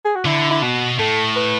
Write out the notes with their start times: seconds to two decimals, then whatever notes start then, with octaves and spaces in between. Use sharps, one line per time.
0.05 G#4
0.15 F#4
0.25 D3 E4
0.51 E4
0.62 B2 F#4
0.99 A2 A4
1.36 B4